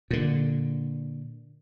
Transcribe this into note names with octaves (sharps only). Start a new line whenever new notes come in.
A#2 D3